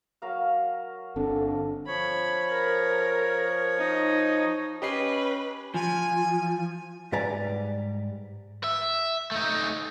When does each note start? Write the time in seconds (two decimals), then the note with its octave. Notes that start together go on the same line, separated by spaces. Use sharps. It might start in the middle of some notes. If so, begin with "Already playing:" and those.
0.22 F#3 A#4 F5
1.16 G1 C4 D4 A4
1.87 F3 C#5 B5
2.50 A#4
3.78 D#4
4.82 C#4 G4 B4 D#5 C7
5.74 F3 G#5
7.12 G#2 G3 B4 D5 G#5 A#5
8.64 E5
9.31 A3 D#4